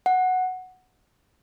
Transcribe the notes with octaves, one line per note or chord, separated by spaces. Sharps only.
F#5